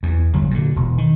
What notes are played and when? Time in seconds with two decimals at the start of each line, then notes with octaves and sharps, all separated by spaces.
0.03 E2
0.33 G1 F#3
0.51 A#2 D3
0.76 E1
0.98 D#3